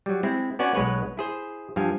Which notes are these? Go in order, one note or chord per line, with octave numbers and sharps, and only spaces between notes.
F#3 G3
G#3 C4 E4
B3 C#4 F#4 D5 G#5
B1 G#3 B4 C#5 F#5
E4 G#4 C5
G2 F3 F5 G#5